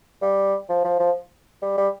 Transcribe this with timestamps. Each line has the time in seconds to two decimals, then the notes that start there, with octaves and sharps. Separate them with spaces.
0.22 G3
0.69 F3
0.85 F3
1.00 F3
1.62 G3
1.78 G3